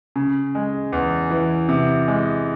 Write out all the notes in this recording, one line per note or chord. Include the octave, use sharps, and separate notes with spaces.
C#3
G#3
E2
E3
C3
G#3